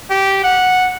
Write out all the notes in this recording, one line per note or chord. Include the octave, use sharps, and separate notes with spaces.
G4
F#5